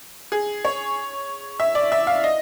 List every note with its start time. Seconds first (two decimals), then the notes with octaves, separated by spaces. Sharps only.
0.32 G#4
0.65 C#5
1.60 E5
1.75 D5
1.92 E5
2.07 F5
2.24 D#5